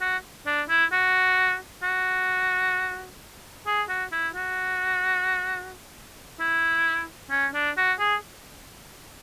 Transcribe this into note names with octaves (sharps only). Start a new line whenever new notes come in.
F#4
D4
E4
F#4
F#4
G#4
F#4
E4
F#4
E4
C#4
D4
F#4
G#4